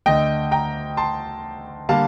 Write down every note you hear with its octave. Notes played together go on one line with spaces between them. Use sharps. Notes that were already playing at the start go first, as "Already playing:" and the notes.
D2 D3 A3 D#5 G5
G5 A#5
A5 C6
D3 G3 A#3 F5 A5